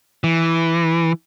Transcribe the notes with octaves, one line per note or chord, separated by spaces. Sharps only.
E3